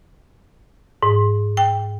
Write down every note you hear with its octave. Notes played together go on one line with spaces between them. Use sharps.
G#2
G5